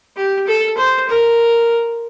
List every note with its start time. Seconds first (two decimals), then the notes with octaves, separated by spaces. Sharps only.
0.16 G4
0.47 A4
0.77 C5
1.09 A#4